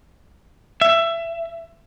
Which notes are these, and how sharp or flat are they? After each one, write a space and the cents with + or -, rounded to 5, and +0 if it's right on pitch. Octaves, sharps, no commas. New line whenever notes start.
E5 +20